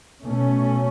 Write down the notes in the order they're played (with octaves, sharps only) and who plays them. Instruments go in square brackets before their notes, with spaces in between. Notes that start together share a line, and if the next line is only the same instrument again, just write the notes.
[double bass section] B2 A3 C#4